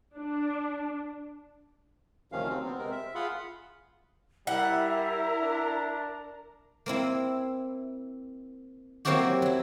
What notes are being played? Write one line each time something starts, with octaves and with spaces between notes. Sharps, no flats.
D4
D2 C3 D#3 F3 C#4 F5
F#3 C4
B3 C4
C3 G#3 C4 A#4
E5
F4 G#4 F5 F#5 B5 C6
G3 E4 A#4 E5 F#5 A#5
D4
A#3 C4 E4
F#3 A#3 C4 E4 F#4 G4
F#3 E4